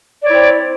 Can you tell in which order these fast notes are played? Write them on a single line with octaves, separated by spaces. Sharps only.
D5 C#5 E4 C4